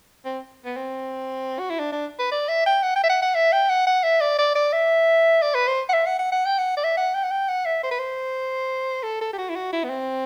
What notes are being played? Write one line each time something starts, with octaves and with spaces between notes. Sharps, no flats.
C4
B3
C4
F#4
E4
D4
D4
B4
D5
E5
G5
F#5
G5
E5
F#5
F#5
E5
G5
F#5
F#5
E5
D5
D5
D5
E5
D5
B4
C5
F#5
E5
F#5
F#5
F#5
G5
F#5
D5
E5
F#5
G5
F#5
G5
F#5
E5
C5
B4
C5
A4
A4
G4
F#4
E4
F#4
E4
B3
C4